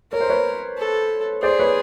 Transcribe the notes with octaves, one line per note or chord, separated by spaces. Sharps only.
A#4 C#5
C5
B4 C#5
A4
G#4 C5 D5
B4 C#5